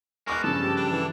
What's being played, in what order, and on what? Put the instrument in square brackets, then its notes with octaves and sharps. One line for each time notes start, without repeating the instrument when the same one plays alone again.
[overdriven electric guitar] G#3 B3 [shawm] A#4 [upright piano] C#6 D6 F#6
[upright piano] G2 C#3 F3 [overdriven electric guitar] A4 [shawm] A5
[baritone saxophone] G4
[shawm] D4
[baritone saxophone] E3